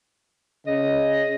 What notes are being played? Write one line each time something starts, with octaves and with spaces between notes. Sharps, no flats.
C#3 D#5